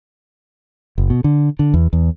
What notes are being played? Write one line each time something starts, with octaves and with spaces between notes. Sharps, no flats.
F#1
B2
D3
D3
E2
E2